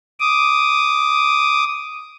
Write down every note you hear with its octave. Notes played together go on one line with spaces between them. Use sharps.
D6 D#6